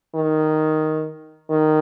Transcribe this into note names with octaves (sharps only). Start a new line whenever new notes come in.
D#3
D#3